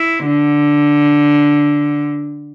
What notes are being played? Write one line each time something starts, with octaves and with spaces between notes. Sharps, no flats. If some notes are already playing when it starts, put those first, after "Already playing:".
Already playing: E4
D3